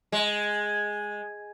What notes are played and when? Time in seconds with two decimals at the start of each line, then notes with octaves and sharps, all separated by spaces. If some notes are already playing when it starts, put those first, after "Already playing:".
0.12 G#3